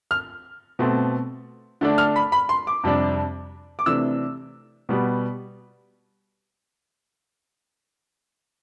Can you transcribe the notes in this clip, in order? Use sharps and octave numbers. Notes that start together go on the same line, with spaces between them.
F6
B2 A3 C4
D3 A3 D4
F6
B5
B5
C6
D6
F2 C3 G3 D4
D6
C3 E3 A3 D4 E6
B2 G3 B3